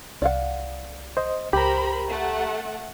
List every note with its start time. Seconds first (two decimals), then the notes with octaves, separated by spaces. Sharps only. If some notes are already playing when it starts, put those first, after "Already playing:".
0.22 C2 D5 F5 F#5
1.17 C5 D#5
1.53 C#2 G4 A#4 C5 A#5 B5
2.08 A3 F#5